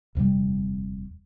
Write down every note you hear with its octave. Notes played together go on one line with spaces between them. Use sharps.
D#1 F2 C3 G3